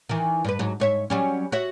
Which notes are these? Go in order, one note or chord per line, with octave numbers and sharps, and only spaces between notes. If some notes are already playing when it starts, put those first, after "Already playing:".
D#3 E3
G2 B4
G#2 F#3
G#2 C#5 E5
F#3 G3 C#4
F#4 C#5 E5